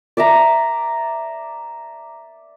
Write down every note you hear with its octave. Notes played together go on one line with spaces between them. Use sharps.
D5 E5 A5 A#5